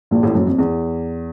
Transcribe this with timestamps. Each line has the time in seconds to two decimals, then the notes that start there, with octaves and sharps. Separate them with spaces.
0.11 A#1 A#2
0.23 A1 A2
0.34 F#1 F#2
0.47 F2
0.58 E2